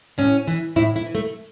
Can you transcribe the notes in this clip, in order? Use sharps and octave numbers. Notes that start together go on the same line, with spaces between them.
A2 C#4
E3
A2 E4
E4
E3
A3